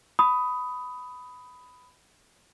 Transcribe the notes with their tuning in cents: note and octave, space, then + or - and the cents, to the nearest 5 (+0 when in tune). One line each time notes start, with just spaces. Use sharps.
B5 +10 D#6 +10